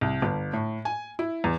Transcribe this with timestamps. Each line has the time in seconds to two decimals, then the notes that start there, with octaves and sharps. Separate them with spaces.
0.01 C2
0.22 G1
0.53 A2
0.85 G#5
1.19 E4
1.44 E2